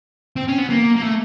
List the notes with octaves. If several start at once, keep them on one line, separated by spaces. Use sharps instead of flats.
C4
C#4
B3
A#3
A#3
A3